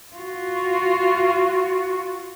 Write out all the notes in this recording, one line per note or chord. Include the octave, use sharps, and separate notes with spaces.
F4 F#4